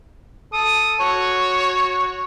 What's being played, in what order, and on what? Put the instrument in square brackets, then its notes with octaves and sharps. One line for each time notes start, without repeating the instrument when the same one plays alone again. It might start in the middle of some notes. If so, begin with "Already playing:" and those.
[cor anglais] A4 [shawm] D#6
[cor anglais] F#4 [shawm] C#5